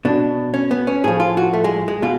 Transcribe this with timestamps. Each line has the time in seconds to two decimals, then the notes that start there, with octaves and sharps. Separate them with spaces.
0.05 B2 D4
0.54 C#4
0.71 B3
0.87 C#4
1.04 A2 F3 G#4
1.20 F4
1.37 F#4
1.53 A3
1.64 G#3
1.88 G#3
2.02 B2 F4